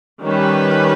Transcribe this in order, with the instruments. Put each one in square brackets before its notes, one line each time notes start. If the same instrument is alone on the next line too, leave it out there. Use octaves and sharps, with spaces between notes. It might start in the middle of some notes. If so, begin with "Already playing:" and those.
[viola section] D#3 G3 C#4 G4 B4